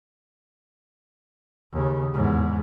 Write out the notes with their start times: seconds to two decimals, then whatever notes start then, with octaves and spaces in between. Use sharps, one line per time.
1.73 D#2 C#3
2.13 E2 G#2